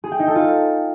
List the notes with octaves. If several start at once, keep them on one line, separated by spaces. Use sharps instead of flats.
G#4
G5
D#4
A4
F4